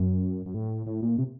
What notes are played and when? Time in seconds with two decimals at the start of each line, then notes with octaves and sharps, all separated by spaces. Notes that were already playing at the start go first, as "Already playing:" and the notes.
Already playing: F#2
0.46 F#2
0.54 A2
0.87 A2
1.02 A#2
1.18 C3